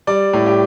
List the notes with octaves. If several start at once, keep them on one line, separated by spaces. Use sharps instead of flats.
G3 D5
A2
G4